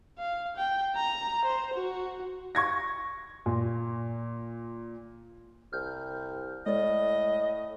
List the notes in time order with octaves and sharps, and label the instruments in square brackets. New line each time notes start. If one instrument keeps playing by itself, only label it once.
[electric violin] F5
G5
A#5
C5
F#4
[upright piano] C#6 G#6 A#6
A#2
[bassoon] C2 [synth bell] F6 G6
[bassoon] A2 [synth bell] G#3 D5 [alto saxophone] D#5